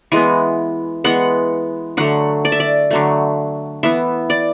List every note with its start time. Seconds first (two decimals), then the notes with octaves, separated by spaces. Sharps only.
0.12 E3 G#3 B3 G#5
1.04 E3 G#3 B3 F#5
1.97 D3 F#3 A3 F#5
2.45 D5
2.52 E5
2.60 D5
2.91 D3 F#3 A3
3.83 E3 B3 E5
4.30 D5